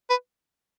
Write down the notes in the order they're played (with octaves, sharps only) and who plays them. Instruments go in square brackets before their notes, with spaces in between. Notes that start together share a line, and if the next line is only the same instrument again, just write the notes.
[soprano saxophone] B4